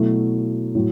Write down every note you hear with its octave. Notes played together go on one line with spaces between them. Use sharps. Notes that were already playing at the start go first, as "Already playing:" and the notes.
Already playing: B2 F#3 A3 E4
A2 F#3